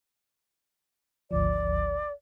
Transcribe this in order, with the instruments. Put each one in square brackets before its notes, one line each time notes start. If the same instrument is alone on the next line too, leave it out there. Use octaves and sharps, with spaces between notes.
[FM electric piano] G#1 D2 F3 [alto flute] D5